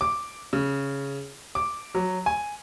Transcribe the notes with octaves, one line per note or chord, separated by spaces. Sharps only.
D6
C#3
D6
F#3
G#5